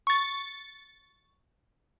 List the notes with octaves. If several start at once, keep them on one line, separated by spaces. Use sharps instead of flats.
C#6 A6